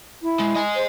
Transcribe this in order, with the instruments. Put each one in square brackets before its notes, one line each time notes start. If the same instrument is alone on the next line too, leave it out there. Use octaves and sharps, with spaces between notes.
[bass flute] E4
[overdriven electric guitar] G#3
D#5 G#5
[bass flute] C5